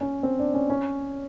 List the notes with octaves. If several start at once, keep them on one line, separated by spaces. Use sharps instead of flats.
C#4
C4
D4
C#4
C#4